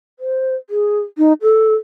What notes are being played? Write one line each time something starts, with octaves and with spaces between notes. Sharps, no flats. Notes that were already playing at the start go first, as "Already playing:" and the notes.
C5
G#4
D#4
A4